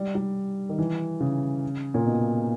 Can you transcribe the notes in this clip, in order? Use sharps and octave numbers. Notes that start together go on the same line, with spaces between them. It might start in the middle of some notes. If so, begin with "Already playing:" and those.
Already playing: G3
G3
D#3
E3
C#3
A#2
B2